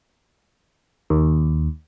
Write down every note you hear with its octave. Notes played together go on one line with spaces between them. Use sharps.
D#2